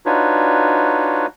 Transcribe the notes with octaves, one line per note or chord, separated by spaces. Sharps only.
D4 D#4 F4 F#4 B4 C#5